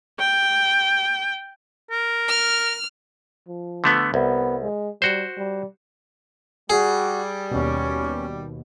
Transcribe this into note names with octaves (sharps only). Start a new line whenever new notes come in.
G5
A#4
F6
F3
D3 A3 B3
C2 B3
G#3
G3 F#4 C5
G3
G3 F#4 G#4
D#2 B2 C#4